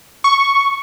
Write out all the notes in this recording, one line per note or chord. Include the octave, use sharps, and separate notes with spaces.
C#6